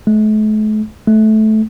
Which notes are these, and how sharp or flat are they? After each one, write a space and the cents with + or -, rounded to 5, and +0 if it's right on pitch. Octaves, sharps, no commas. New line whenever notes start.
A3 -45
A3 -20